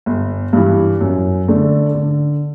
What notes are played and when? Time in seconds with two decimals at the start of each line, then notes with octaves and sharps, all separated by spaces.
0.06 G1
0.53 G2 E3
1.01 F#2
1.48 D3 A3 D4
1.94 D3